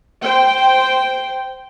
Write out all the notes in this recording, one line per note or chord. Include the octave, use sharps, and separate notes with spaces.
C5 G5